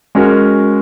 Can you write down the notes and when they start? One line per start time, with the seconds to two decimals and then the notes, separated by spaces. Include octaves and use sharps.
0.15 G#3 C#4 F#4 A#4